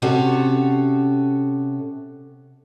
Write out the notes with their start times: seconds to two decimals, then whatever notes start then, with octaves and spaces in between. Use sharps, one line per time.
0.02 C3 C#4 F#4 A4